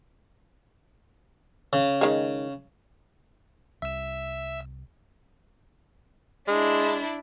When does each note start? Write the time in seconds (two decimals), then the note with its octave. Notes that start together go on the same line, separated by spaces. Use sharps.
1.73 C#3
2.01 D#3 G#3
3.82 C2 E5 E6
6.48 G#3 D4 E4